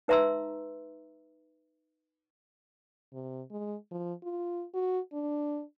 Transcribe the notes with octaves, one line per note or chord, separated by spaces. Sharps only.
D#4 B4 E5 A#5 C6 E6
C3
G#3
F3
F4
F#4
D4